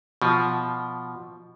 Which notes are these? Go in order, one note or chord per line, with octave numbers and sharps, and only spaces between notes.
B2 F3